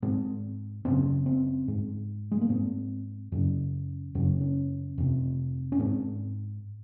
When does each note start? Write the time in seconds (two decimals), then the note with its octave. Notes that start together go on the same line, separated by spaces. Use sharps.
0.02 G#2 C4
0.85 F#2 C#3 C4
1.26 C4
1.68 G#2
2.32 G#3
2.41 A#3
2.49 G#2 C4
3.32 F#2 C#3
4.15 F#2 C#3 C#4
4.41 C#4
4.98 F2 C3
5.72 C#4
5.79 G#2 C4